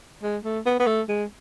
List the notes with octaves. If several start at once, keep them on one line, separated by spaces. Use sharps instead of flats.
G#3
A3
B3
B3
A3
G#3